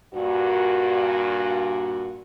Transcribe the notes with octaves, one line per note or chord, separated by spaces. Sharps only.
G2 A#2 F#4